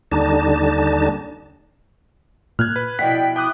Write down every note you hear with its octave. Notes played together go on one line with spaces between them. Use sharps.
D#2 D3 G3 D4 D#4 A5
A#2 F6 F#6 G#6
B4
B2 F3 E4 D5 D#5 F#5 G5 B6
G5 D6 D#6 F#6